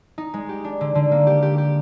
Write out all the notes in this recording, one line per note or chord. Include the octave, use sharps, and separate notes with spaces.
D#4
G#3
G4
D4
D3
D3
A#3
G4
G4
G4